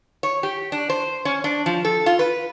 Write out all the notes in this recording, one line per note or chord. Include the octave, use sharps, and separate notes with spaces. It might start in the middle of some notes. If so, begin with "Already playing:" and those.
C#5
G4
D4
C5
C#4
D4
F3
A4
F4
B4